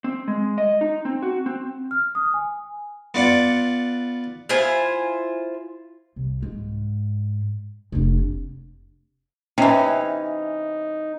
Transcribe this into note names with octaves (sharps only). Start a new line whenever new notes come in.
C4
G#3
D#5
D#4
C4
F#4
C4
F6
D#6
G#5
B3 F4 D5 F#5
E4 F4 C5 G#5
C2
G#2
F1 D4
C3 E3 C#4 D#4